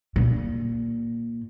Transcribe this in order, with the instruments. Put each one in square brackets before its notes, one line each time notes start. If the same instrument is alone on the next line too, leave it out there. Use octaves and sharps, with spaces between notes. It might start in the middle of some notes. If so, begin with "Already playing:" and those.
[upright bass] A#2